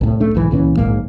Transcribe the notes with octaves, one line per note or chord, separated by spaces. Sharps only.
C2 A2
C#2 A3 D4
B1 G#2 E3
C#2 A#2 E3 C#4
D1 A#1 G#2 A#3